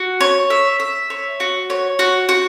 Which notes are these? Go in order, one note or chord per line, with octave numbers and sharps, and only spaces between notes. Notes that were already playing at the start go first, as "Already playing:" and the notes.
Already playing: F#4
C#5
E5
E5
C#5
F#4
C#5
F#4
F#4